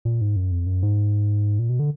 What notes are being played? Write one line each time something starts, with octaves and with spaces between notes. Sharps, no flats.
A#2
G#2
F#2
F2
F#2
G#2
A#2
B2
D3